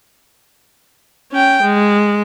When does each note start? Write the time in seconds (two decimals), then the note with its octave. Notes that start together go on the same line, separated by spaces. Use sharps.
1.32 C#4 G5
1.62 G#3